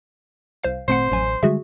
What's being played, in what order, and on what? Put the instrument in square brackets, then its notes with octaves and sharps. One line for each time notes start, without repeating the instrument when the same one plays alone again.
[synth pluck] C2 C5 F5
[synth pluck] G#1 A3 F#5 [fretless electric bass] A#2 C4 [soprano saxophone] C5
[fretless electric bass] A1 [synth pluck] F#2 F#3 G#5
[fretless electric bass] D3 G3 G#3 [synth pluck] F#4 G#4 E5